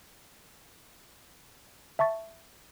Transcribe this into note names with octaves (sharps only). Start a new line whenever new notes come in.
E5 A5 C#6 A6